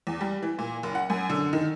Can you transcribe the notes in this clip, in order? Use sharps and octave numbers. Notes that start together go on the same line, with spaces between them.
E2
G3
E3
A#2
F#1
F#5
F#2
D3
D#3